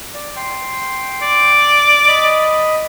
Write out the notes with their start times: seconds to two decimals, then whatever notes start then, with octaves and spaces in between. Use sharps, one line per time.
0.14 D5
0.36 G5 C6
1.22 D5
2.08 D#5 B5